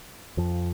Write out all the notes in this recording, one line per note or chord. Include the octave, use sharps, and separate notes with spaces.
F2 F3